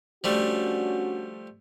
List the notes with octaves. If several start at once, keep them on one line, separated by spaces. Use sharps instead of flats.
F3 G3 A3 C#4 D4 F#4